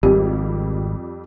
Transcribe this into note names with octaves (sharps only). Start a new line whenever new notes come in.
G#1 F2 G3 G4